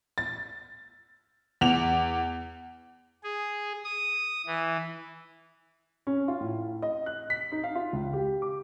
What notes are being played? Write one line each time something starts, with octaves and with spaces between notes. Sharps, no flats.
A6
E2 F7
G#4
D#6
E3
C#4
F4
A2
D#5
F#6
B6
D#4
F5
F4
C#2
G4
D6